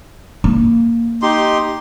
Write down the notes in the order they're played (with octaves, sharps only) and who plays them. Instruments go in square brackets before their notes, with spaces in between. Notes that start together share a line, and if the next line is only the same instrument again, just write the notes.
[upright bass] A#3
[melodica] D#4 G4 C6